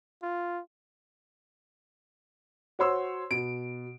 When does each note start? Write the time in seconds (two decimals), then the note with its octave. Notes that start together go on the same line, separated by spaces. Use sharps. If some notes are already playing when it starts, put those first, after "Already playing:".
0.23 F4
2.79 F#4 C5 C#5 C6 E6
3.31 B2 D7